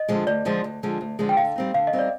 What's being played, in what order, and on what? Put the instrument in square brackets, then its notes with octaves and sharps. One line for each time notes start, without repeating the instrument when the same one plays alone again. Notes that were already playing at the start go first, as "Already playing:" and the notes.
Already playing: [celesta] D#5
[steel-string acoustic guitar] D3 F3 G#3
[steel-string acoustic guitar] D2 [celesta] D5
[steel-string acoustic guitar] D3 F3 G#3
D2
D3 F3 G#3
D2
D3 F3 G#3
[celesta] G5
[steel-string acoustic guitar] D3 [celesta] F5
[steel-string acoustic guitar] G3 C4 D#4
[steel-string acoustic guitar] D3 [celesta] F5
[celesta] D#5
[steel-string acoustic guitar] G3 C4 D#4
[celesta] D5